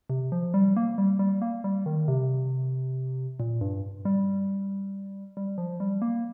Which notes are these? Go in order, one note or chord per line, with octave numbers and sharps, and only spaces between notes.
C3
F3
G3
A#3
G3
G3
A#3
G3
D#3
C3
A#2
G2
G3
G3
F3
G3
A#3